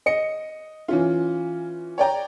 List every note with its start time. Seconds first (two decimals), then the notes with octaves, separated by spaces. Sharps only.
0.06 D#5 C#7
0.88 E3 C#4 F4
1.98 C#5 D5 G5 A#5